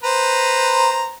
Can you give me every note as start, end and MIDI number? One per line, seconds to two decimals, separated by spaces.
0.03 1.13 71
0.03 1.13 72
0.03 1.13 82